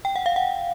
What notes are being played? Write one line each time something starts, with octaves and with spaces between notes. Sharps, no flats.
G5
F#5
F5
F#5